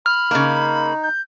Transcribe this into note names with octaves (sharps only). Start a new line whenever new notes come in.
B5 F6
C#3 A#3 D#4
G6